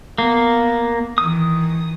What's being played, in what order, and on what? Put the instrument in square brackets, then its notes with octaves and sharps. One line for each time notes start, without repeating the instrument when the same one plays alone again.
[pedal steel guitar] A#3 [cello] B3
[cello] D#3 E3 [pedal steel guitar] D#6